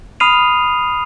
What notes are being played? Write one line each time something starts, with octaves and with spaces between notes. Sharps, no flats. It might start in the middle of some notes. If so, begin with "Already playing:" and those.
B5 D#6 F6 C7 D#7 F7